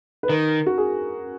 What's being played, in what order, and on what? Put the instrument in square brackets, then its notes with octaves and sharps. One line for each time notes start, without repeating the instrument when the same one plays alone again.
[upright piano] B4
[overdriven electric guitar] D#3 [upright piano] A#4
[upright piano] F#4
G#4